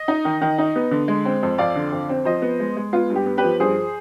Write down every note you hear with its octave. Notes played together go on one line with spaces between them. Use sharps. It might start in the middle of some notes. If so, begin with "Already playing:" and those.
Already playing: D#5
D#4
D#3
D#3
D#4
B3
D3
G#3
C4
F2
F2 D5 F5
D3
F2
C4
F3 C5 D#5
B3
G#3
G#3
B3 F4
G2
G4
B3
G4 B4
F3
G2 G#4 C5